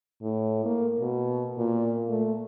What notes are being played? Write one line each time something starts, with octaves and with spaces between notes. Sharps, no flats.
A2
A#3
B2
A#2
A3